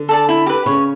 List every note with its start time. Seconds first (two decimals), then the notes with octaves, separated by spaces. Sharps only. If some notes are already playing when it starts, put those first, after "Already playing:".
Already playing: D3
0.09 A4 D5 A5
0.29 E4
0.46 G4 B4
0.66 C#3 C#5